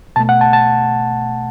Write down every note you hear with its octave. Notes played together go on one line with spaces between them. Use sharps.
B2 A3 A5
F#5
A5
A5